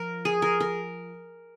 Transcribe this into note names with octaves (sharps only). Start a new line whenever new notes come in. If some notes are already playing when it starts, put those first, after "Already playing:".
Already playing: F3 A#4
G#4
A#4
A#4